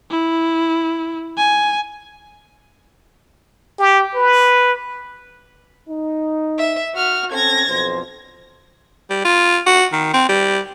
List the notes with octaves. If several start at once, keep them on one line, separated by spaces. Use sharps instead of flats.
E4
G#5
G4
B4
D#4
E5
F#4 F6
C4 C#4 A4 G#6 A#6
B1 F2 C5
G3
F4
F#4
D#3
C4
G3